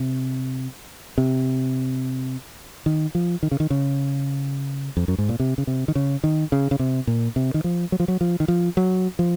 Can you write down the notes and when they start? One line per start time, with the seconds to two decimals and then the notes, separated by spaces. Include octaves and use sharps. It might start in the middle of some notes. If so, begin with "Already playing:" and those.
Already playing: C3
1.18 C3
2.86 D#3
3.15 F3
3.43 D#3
3.52 C#3
3.60 D#3
3.70 C#3
4.97 F2
5.08 F#2
5.18 G#2
5.29 A#2
5.40 C3
5.58 C#3
5.67 C3
5.88 D#3
5.95 C#3
6.24 D#3
6.52 C#3
6.71 C#3
6.79 C3
7.07 A#2
7.36 C3
7.54 D#3
7.64 F3
7.92 F#3
8.00 F3
8.08 F#3
8.21 F3
8.40 D#3
8.48 F3
8.77 F#3
9.19 F3